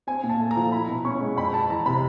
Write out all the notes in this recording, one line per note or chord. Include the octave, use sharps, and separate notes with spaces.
C4 G#5
A#2
A5
A3
A#5
F3
E4 B5
B2
C#4 C#6
G#3
F2 B5
F2 A5
E3 A#5
C3 B5